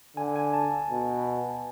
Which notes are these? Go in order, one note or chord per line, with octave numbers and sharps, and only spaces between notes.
D3 G#5
G#5
A5
B2